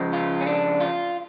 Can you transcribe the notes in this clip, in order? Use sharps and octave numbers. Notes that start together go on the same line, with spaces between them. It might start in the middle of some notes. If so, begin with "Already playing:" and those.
Already playing: C#3 F3 G#3
F4
C#4
D4
F4